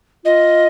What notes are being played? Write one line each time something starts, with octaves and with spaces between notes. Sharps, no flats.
F4 D#5